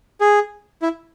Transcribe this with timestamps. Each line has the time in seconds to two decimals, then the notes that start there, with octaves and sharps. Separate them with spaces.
0.21 G#4
0.82 E4